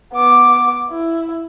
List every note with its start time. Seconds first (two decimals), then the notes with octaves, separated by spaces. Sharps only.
0.14 B3 D6
0.90 E4